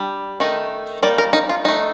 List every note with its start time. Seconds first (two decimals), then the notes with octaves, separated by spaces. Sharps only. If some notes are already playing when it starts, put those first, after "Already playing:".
Already playing: G3 D4
0.40 D#3 A3 D#4
1.02 G3 A#3 D#4 D5
1.18 A#4
1.33 D#4
1.49 F4
1.64 A3 D4 D#4